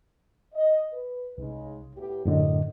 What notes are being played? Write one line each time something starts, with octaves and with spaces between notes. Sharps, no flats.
D#5
B4
C2 C#3 G#3 D#4
A2 B3 G4
F#2 A2 D3 D#5